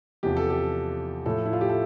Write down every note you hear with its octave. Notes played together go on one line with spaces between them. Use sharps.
E2 C3 F3 G4
A4
G4
A2 F3 A4
E4
F4
G4
A4